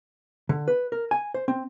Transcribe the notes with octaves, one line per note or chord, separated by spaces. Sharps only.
D3
B4
A#4
G#5
C5
C4